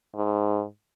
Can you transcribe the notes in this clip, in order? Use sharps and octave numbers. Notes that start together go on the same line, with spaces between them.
G#2